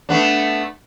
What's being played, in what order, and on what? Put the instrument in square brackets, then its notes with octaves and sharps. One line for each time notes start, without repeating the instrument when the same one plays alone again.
[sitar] A3 B3 D4